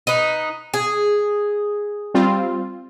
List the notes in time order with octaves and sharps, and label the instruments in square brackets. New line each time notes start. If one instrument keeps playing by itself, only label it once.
[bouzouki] D#4 B4
G#4
[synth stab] G3 C4 F4